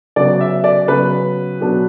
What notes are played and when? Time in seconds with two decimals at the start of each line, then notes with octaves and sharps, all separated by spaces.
0.16 C#3 F#3 B3 D5
0.41 E5
0.64 D5
0.88 C#3 F#3 B3 B4
1.60 B2 F#3 B3 D4